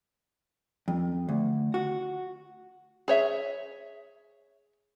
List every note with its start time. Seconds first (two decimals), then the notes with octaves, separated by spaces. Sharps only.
0.88 F2
1.29 D2
1.74 F#4
3.08 G#4 C#5 E5